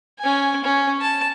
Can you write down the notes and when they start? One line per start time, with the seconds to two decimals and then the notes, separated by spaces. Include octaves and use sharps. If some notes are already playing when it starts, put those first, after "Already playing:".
0.19 C#4 G#5
0.64 C#4
1.01 A5